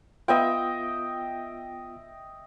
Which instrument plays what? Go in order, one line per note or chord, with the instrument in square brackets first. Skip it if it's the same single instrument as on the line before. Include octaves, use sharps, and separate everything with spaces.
[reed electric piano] B3 F4 [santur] D#5 E5 G5